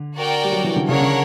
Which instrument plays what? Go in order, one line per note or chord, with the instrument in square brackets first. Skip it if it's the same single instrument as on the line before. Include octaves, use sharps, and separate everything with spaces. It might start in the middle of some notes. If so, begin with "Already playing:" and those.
Already playing: [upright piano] D3
[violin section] F#4 A#4 D5 G5
[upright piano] G3
F#3
E3
D3
[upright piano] C#3 [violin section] D4 A#4 C#5 F#5
[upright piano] D3